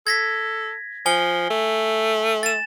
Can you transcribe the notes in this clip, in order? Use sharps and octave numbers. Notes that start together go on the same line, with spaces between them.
A4 G#6 A#6 B6
F3 G#5 G7
A3
A6 E7